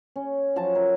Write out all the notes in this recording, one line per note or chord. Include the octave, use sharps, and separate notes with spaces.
C#4
F3 F#3 A5
A#4 E5